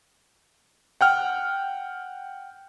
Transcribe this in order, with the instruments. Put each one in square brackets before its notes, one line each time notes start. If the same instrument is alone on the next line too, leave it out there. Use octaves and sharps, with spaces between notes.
[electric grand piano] F#5 G5 F6